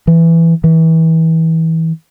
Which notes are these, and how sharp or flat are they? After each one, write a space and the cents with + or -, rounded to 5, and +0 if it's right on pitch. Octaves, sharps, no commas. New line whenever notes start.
E3 +10
E3 -25